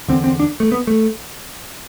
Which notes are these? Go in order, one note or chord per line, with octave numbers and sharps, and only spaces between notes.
E2 D3 C4
C4
D4
A3
B3
A3